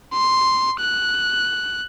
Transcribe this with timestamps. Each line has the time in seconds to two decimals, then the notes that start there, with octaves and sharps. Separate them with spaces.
0.13 C6
0.80 F#6